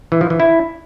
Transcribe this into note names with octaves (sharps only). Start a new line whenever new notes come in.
E3
F3
E3
E4